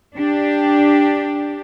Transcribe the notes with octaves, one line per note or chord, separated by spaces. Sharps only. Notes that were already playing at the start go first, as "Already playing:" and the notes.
D4 G4